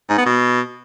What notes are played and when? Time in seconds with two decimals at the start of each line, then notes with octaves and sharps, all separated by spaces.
0.09 G#2
0.18 B3
0.26 B2